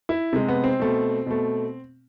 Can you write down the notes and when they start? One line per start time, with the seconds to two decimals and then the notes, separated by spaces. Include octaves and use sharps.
0.09 E4
0.33 C3 G#3
0.48 B3
0.64 C4
0.79 B2 A3
1.26 B2 A3